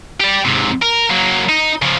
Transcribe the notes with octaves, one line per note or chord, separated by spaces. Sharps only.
G4 D5
G#2 C3
A#4
F#3 A#3
D#4
C#3 F3